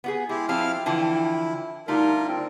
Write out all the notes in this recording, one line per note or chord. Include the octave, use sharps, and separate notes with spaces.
B3 F#4 G#4
G#3 E4 G4
F3 C4 E4 F5 G5 F6
D3 E3 F3 E4
D3 G3 A3 D#4 F4 A#4
C4 G5